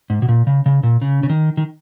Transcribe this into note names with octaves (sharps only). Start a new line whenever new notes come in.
G#2
B2
A#2
C#3
C#3
A#2
C#3
C#3
D#3
D#3